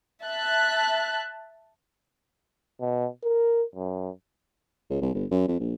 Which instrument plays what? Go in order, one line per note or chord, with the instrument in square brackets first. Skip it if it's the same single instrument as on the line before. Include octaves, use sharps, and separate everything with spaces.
[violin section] E5 A5 F#6
[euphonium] B2
A#4
F#2
[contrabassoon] C#2
C2
G1
F#2
F2
A#1